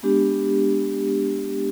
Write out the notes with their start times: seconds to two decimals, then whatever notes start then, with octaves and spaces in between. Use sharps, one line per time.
0.03 G#3 B3 D4 G4